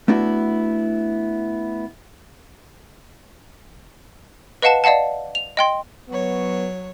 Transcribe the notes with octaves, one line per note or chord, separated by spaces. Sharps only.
A3 B3 D4 E4 F#4
B4 D#5 F5 F#5 A5 E7
D5 D#5 F5 F#5 A5
F7
D#5 G5 C6
F#3 B3 C#5